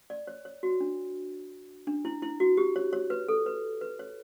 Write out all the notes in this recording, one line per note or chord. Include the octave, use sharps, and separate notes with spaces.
D5
C#5
C#5
F#4
D4
D4
E4
E4
F#4
G4
C#5
C#5
B4
A4
B4
B4
C#5